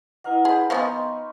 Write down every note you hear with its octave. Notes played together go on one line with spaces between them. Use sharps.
E4 B4 D#5 F5 F#5 A#5
G#4 G5 B5
F3 B3 D#4 G#5 C6 C#6